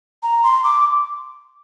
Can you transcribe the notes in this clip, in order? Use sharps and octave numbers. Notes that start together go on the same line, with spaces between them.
A#5
C6
D6